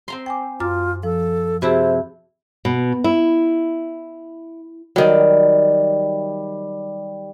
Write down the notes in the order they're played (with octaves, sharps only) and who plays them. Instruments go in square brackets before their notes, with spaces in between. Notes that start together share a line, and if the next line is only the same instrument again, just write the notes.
[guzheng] C4 A#5 C6
[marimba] G5 G#5 D6
[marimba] F#2 D6 F6 [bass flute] F4
[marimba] F3 [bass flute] A4
[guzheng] C3 E4 A5 [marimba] F#4 G#4 [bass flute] C5
[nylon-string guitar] B2
E4
[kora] D#3 F#3 [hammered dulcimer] G3